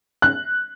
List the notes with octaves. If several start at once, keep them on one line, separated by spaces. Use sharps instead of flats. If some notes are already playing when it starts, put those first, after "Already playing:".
F#6